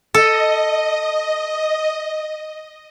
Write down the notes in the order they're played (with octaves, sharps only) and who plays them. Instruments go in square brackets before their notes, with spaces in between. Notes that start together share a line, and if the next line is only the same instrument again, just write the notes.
[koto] A4 [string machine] D#5